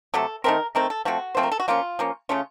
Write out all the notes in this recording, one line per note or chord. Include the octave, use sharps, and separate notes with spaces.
C3 F#3 A3 A4
D#3 A3 C4 A#4
D#3 A3 C4 A#4
A4
F3 A3 C4 F#4
F3 A3 C4 C5
A#4
A4
F#4
F3 A#3 C#4 F4
F3 A#3 C#4
C#3 A3 C#4 F4